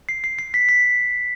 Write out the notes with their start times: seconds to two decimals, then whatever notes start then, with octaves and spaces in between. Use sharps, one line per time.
0.09 C7
0.24 C7
0.39 C7
0.54 B6
0.69 B6